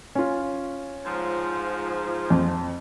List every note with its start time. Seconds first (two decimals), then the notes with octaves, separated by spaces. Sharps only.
0.15 C#4 F4
1.05 G#2 F3
2.30 F2